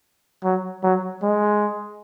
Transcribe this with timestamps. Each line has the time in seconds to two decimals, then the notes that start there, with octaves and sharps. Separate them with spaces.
0.44 F#3
0.83 F#3
1.22 G#3